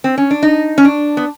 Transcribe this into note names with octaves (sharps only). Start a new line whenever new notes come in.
C4
C#4
D4
D#4
C#4
D4
B3